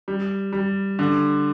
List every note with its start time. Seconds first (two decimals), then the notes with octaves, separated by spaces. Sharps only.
0.08 G3
0.53 G3
0.99 D3